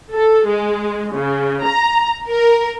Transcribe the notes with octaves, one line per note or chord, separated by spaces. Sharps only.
A4
G#3
C#3
A#5
A#4